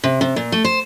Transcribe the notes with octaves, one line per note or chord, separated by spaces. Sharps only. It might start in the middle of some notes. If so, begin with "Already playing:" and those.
C3
C3
A#2
A3
C5